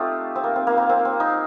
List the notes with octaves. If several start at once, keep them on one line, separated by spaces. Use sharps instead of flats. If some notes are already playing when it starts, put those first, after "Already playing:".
Already playing: A3 C4 D#4 F4 G4
C4
A#3
C4
A#3
A#3
C4
C4
D#4